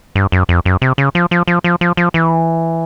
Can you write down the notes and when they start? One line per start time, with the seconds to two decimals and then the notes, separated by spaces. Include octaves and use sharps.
0.16 G2
0.32 F#2
0.49 F2
0.65 F#2
0.82 C3
0.98 C#3
1.15 F3
1.31 F3
1.48 F3
1.64 F3
1.81 F3
1.97 F3
2.14 E3